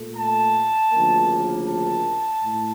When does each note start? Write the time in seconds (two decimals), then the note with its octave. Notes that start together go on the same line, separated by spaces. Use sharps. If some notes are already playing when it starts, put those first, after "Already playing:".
Already playing: A#2 A3
0.17 A5
0.92 D2 C#3 F3 A#3
1.68 A5
2.44 A2